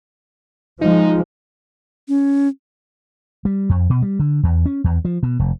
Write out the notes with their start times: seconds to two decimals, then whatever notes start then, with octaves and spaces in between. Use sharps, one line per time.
0.81 F3 G#3 D#4
2.08 C#4
3.45 G3
3.69 F2
3.90 B2
4.02 G3
4.19 D3
4.43 E2
4.66 C#4
4.84 E2
5.05 F3
5.23 B2
5.39 F1